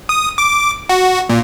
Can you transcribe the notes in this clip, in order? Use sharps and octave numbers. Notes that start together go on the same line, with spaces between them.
D#6
D6
F#4
A#2